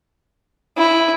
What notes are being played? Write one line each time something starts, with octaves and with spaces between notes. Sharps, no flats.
E4